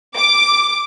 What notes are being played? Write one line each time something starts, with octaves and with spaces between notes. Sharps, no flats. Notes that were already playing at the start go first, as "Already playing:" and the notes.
D6